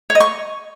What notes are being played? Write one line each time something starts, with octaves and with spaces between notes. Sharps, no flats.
C#5
D#5
C#6